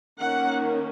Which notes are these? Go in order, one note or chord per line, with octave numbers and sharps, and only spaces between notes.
D#3 A#3 C#4 F#5